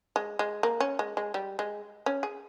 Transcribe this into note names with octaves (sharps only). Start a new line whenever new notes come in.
G#3
G#3
A#3
C#4
G#3
G#3
G3
G#3
C#4
G#4